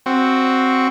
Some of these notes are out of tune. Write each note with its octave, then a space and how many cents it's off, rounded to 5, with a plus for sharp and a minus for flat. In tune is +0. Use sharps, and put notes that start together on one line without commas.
C4 +0 F#4 +0